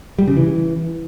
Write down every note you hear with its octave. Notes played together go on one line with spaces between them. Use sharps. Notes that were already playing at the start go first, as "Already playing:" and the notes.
G3
C#3
E3